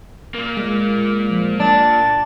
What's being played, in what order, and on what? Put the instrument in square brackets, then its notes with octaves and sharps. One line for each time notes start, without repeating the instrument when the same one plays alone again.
[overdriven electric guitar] A#2 A#3
[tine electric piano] G#3
[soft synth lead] F3
[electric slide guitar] D4 [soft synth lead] A6